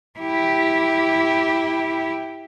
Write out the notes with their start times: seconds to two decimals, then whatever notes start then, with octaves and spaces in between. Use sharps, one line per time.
0.19 E4 G4